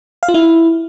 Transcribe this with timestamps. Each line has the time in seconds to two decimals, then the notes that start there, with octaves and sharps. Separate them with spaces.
0.23 F5
0.28 F4
0.34 E4